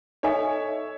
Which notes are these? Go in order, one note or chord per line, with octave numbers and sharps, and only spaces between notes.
D#4 A4 C#5 D#5 E5 G#5